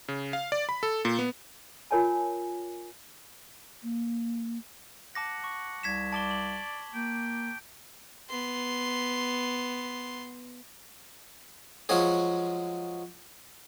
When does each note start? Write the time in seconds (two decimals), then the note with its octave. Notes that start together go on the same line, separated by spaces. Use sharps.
0.08 C#3
0.33 F5
0.52 D5
0.69 B5
0.83 A4
1.05 A#2
1.19 B3
1.91 F4 A#4 C#5 G#5 A5
3.83 A#3
5.15 F#5 A5 D6 A#6
5.44 C#6
5.83 C2 G#6 B6 E7
6.13 D5 A5 D6 G7
6.31 F#7
6.94 A#3 G5
8.29 B3 C6
11.89 F3 F#3 G#3 C#4 G#4